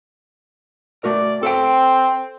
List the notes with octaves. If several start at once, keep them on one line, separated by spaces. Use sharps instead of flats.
A3 F#4 A#4 D5
C4 A4 F5 G5